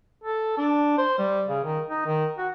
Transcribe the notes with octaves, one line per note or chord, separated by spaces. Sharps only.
A4
D4
C5
G3
C#3
D#3
D#4
D#3
F#4